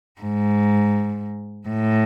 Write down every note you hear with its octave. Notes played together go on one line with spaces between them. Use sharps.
G#2
A2